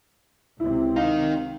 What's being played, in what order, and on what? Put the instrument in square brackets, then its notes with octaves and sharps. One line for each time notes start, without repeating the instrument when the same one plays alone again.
[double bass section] C#2 C3 C4 [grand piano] E4
[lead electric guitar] D#3 D#4 [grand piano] F5